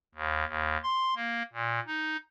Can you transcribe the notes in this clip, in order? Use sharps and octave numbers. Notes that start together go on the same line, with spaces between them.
D#2
D#2
C6
A#3
A#2
D#4